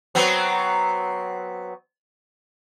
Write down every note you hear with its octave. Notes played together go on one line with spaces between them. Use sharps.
F#3 B3 C4